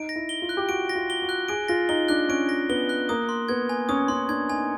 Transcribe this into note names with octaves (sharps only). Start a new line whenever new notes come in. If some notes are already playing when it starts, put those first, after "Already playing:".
Already playing: D#4 D7
A#6
E4
G7
F4
F#6
G4
F#4 D7
A#6
F4
G7
F#4
F#6
G#4 D7
F4 A#6
D#4 G7
D4 F#6
C#4 D7
A#6
B3 G7
F#6
A#3 D#6
C6
B3 G#6
G#5
C#4 D#6
C#4 C6
D4 G#6
D#4 G#5